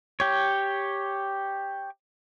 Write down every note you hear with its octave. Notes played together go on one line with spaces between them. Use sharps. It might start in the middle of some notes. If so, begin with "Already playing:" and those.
G4 C#5